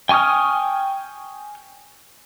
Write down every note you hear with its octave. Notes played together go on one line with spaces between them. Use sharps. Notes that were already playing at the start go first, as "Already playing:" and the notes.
G5 G#5 C#6 D#6 F6